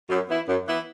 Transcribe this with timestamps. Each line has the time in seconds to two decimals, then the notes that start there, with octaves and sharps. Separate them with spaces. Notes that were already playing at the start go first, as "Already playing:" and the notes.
0.09 F#2
0.28 E3 B3 E4
0.47 F#2
0.66 E3 B3 E4